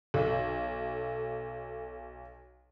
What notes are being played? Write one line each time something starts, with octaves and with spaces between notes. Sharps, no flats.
B1 A4